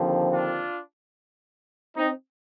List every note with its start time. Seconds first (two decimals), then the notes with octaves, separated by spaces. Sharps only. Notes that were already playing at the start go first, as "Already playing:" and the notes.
Already playing: D#2 D3 F3 C4
0.32 D4 F4
1.97 C4 D#4